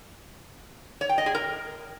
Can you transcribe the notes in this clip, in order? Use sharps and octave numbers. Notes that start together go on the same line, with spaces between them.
C#5
G5
D#5
G#4
A#4